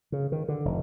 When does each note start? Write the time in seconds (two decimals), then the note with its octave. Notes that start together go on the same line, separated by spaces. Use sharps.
0.12 C#3
0.32 D#3
0.48 D3
0.65 F1